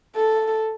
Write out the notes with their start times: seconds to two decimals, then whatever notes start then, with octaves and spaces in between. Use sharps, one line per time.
0.15 A4